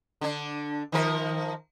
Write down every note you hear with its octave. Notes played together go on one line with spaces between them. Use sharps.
D3 D4
D#3 F3 A#4